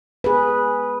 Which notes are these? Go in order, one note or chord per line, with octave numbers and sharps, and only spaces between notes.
G#4 B4